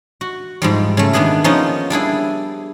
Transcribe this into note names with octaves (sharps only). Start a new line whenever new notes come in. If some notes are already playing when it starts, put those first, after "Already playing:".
F#4
G#2 F3 G3
C#3 A3
D#3 B3 D4 G#4 B4
F3 A#3 B3 C#4 D#4
G3 D4 E4 G#4